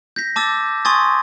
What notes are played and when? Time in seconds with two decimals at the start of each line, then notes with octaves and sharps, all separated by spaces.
0.16 G6 A#6 B6
0.36 A5 D6 E6 A6
0.85 G#5 C6 C#6 D#6 G#6 A6